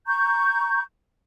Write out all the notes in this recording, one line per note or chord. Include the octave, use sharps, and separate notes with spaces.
A#5 C#6 G6